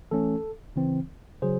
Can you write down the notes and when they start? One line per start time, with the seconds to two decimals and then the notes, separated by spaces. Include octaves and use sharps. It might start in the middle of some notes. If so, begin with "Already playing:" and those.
0.11 E3 A3 C#4 A4
0.76 C#3 E3 C4
1.42 C#3 F#3 G#4 C5